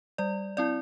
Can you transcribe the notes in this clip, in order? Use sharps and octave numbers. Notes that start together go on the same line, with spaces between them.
G3 D5
C4 E4 D5